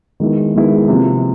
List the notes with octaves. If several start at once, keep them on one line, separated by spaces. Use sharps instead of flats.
D#3 G#3 B3 E4
D#3 G#3 B3 E4
C3 F3 A#3